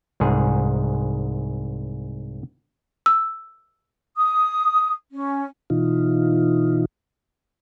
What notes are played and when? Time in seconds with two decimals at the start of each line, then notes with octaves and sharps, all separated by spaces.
0.20 C2 G#2 G#4
3.06 E6
4.16 D#6
5.12 C#4
5.70 B2 E3 D#4 F4